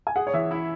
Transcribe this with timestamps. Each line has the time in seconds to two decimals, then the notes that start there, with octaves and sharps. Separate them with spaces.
0.07 G#5
0.16 G#4 F#5
0.27 C#5
0.33 E3 E5
0.51 E4